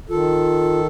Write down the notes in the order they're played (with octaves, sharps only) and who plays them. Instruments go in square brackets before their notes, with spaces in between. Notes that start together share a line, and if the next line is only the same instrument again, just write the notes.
[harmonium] D#3 A4 [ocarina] F4